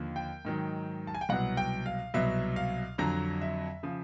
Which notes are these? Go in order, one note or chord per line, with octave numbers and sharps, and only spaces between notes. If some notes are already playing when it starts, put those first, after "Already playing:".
Already playing: D#2 D3 F3
G5
G#2 D#3 F#3
A5
G#5
G5
C2 B2 F#3 F#5
G5
F5
C2 B2 F#3 E5
F5
F2 D3 F#3 A#5
E5
C#3 F3